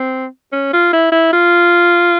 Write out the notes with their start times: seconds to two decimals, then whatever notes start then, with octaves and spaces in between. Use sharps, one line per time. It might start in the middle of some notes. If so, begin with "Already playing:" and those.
Already playing: C4
0.52 C#4
0.73 F4
0.93 E4
1.12 E4
1.33 F4